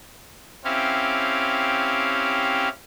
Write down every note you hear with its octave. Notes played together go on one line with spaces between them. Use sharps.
C4 C#4 E4 G4 F5